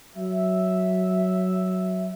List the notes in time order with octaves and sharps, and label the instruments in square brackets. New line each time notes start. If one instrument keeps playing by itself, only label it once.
[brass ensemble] F#3 E5